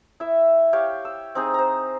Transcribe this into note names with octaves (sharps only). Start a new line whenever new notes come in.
E4 E5
G4 C#5 F5 G5
E6
C4 D#4 G#4
C5 A#5